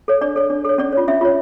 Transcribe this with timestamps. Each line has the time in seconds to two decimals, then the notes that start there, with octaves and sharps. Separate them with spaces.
0.08 A4 C#5
0.21 D4 D5
0.36 A4 C#5
0.50 D4
0.65 A4 C#5
0.78 C#4 D5
0.93 F4 C#5
1.08 C#4 E5
1.21 F4 C#5